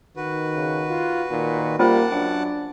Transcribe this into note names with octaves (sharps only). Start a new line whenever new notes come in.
D#3 F#4 B4
C#3
F4
A#2 D#3
G3 A#3 C#4 F4 C5 F#5 A5 D6
F#2 D4 G5